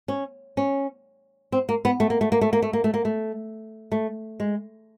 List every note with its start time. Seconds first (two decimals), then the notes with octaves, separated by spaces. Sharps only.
0.08 C#4
0.57 C#4
1.52 C4
1.69 A#3
1.85 B3
2.00 A3
2.10 A#3
2.21 A3
2.32 A#3
2.41 A3
2.53 A#3
2.62 A3
2.73 A#3
2.84 A3
2.94 A#3
3.05 A3
3.92 A3
4.40 G#3